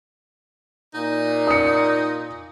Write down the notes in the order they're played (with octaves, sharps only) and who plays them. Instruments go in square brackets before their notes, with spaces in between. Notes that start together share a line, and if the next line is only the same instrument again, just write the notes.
[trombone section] A#2 [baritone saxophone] D#4
[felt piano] D#6 C#7